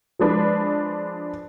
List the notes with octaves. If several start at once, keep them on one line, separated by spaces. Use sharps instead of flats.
F3 G#3 D4 B4